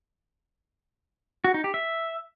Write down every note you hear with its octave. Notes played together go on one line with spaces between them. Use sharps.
F#4
D#4
G4
E5